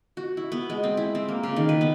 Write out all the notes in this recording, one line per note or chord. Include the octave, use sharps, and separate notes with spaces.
F#4
E4
B3
G#3
C4
E4
C4
A#3
C#3
D#3
B4
B3